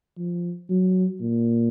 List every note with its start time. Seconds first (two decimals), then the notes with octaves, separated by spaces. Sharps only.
0.18 F3
0.70 F#3
1.21 A#2